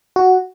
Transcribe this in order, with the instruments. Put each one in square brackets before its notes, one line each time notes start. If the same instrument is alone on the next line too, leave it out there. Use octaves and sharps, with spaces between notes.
[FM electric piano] F#4